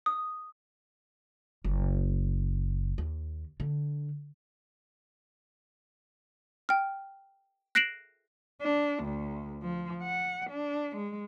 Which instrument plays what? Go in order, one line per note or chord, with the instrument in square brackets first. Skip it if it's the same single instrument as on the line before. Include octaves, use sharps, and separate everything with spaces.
[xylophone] D#6
[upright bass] F#1
D#2
D3
[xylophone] G5 F6
F#6 A#6 C7 D7 E7 F#7
[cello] D4
D2
F3
F#5
D4
G#3